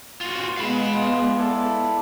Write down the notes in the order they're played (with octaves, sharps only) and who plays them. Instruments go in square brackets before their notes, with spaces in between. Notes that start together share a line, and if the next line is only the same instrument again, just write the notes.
[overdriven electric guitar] F4 F#4
[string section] G#3 B3 [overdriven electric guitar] F5 B5
[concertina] F4
E4 A4 D5